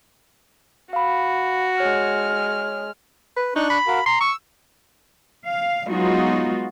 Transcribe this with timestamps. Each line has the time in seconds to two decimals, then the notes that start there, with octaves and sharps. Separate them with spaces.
0.93 F#4 F5 B5
1.80 G#3 C#5 F6
3.36 B4
3.56 D4 D#4 C#6 F#6
3.70 B5
3.87 F#4 A#4 F5
4.06 A#5 C6
4.20 C#6 E6
5.45 F5
5.87 F#3 G#3 B3 D#4 F4 F#4